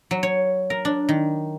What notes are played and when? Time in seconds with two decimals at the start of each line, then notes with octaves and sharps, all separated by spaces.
0.11 F#3
0.23 C#5
0.70 A#4
0.85 D4
1.09 D#3